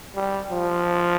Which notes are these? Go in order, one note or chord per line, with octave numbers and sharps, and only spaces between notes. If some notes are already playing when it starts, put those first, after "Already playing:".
G3
F3